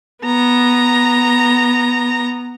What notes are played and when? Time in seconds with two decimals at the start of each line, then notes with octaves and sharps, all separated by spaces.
0.24 B3 A#5